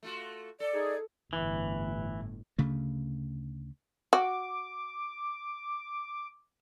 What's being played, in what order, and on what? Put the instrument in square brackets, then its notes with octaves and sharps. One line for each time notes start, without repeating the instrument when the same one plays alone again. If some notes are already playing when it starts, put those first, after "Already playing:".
[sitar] A3 F4 F#4
[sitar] A4 [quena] D5
[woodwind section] D#4 G#4
[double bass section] G1 A2 [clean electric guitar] E3
[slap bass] D2 C#3 A3
[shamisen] F#4 [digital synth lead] D6